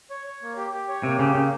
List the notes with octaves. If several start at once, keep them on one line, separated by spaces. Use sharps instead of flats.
C#5
C#5
A#3
G4
G4
C#5
C3 A#3
C#3 G4
C#3 A#3